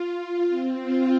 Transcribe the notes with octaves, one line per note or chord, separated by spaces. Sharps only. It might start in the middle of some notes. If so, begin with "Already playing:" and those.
Already playing: F4
C4
F4